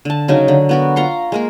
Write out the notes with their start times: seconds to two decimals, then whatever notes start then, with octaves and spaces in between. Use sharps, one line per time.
0.05 D3 A5
0.28 C#3 F#3 D#4 A#4
0.48 D3
0.69 B3 F#4 A#4
0.96 F4 A#5 C6 C#6
1.32 G#3 A#3 A#4